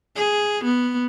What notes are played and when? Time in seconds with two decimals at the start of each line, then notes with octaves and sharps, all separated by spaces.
0.16 G#4
0.64 B3